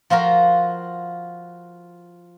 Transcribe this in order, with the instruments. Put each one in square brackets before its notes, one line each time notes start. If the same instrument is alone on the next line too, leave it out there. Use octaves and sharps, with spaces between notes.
[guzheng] F3 F4 F#4 A#4